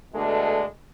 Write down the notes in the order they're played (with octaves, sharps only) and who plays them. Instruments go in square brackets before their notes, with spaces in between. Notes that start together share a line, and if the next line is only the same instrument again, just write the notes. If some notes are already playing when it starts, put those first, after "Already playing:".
[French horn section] B2 D3 G#3 A3 D4